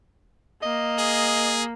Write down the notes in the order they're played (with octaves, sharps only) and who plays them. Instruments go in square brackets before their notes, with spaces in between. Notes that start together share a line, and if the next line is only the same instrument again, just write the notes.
[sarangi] A#3 [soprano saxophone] D#5
[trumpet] G#4